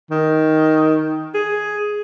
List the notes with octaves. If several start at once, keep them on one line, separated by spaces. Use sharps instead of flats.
D#3
G#4